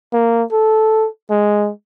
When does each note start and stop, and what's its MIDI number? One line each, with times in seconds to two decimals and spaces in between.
0.13 0.44 58
0.52 1.08 69
1.30 1.71 56